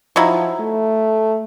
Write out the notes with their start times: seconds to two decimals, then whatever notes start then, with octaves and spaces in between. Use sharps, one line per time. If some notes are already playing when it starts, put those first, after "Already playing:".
0.16 F3 F#3 D#4 E4
0.60 A3